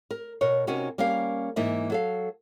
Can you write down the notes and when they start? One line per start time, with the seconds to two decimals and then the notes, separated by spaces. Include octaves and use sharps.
0.11 A#4
0.41 B2 A#4 C#5
0.67 C3 C#4 D#4 F#4 G4 A#4
0.98 G3 A#3 C#4 A#4 F5
1.56 G#2 E3 A#3 D#4 E5
1.90 F#3 A4 F5